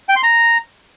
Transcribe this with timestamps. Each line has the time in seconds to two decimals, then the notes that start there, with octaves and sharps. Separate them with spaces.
0.09 G5
0.16 C6
0.23 A#5